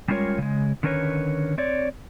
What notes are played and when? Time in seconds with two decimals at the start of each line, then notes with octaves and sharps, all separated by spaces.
0.08 G3 G#3 C#4 F4 A#4 C#5
0.38 C#3 G#3
0.83 D3 D#3 C#4 A#4 B4 C#5
1.58 C4 C#5 D5